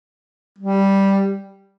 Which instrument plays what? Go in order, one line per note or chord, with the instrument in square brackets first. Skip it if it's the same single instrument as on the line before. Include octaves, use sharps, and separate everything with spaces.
[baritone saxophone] G3